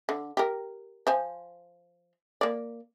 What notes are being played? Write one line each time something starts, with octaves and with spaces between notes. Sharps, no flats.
D3
G4 A#4
F3 C5 G#5
A#3 D5